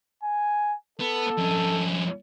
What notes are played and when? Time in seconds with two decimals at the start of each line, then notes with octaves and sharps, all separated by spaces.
0.24 G#5
0.99 B3 A4
1.37 F2 C#4